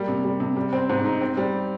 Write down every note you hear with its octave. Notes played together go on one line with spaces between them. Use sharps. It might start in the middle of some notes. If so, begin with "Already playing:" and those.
Already playing: G3 A#3
C3
G3
C3
G3
C4
G#2
D#4
C4
G3